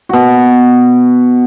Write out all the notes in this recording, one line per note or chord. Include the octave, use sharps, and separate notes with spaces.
B2 F#4